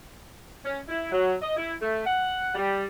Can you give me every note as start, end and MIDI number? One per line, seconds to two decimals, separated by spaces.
0.64 0.79 61
0.88 1.07 64
1.11 1.34 54
1.42 1.56 75
1.56 1.73 64
1.81 2.03 57
2.05 2.53 78
2.55 2.85 55